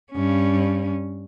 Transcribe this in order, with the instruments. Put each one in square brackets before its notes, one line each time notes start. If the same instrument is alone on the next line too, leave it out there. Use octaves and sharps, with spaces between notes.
[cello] G2 C#4